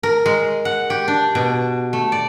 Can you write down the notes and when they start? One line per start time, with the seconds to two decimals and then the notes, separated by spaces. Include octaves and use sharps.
0.03 A#4
0.26 G#3
0.65 F#5
0.90 G4
1.08 D4
1.35 B2
1.93 A3
2.12 D5